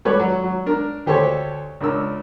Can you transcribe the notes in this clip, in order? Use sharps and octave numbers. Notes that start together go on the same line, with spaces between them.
G3 A4 B4 C#5 D5
F#3
F#3
D4 A#4
D2 G4 A4 C5 C#5
C#2 D4 A#4 E6